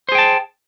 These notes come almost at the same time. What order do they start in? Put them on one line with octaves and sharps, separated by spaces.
C5 G#4 G5 A5